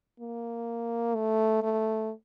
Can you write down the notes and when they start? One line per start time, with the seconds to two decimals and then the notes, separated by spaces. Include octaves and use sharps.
0.20 A#3
1.15 A3
1.62 A3